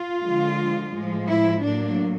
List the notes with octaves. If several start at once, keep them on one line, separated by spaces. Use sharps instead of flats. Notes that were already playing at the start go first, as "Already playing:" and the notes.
Already playing: F4
D3 F3 G#3
A2 F3 G#3
E4
A2 F#3 A#3 D4